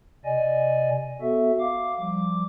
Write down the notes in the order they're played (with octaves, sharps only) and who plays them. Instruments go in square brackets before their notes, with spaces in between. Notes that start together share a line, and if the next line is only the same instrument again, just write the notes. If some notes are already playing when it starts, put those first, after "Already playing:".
[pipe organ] C3 D5 D#5 G#5
B3 F#4 A4 E5
F5 D6
F3 G3 D6